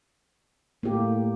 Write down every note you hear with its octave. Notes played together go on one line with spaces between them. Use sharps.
A2 A#3 G4